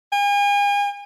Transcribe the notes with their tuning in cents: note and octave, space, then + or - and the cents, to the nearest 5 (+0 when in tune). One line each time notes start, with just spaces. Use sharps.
G#5 -40